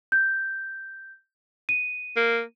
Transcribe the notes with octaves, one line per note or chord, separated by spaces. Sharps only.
G6
D#7
A#3